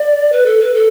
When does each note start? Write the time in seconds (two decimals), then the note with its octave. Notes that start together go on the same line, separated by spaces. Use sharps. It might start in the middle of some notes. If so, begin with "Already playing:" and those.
Already playing: D5
0.32 B4
0.46 A4
0.60 B4
0.74 A4